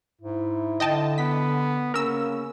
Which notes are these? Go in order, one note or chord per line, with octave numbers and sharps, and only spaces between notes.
G#2 E4
D3 D#5 G5 A5
B3 B6
C#3 A#3 C#4 A#4 E6